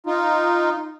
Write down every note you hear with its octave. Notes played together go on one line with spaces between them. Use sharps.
D#4 F4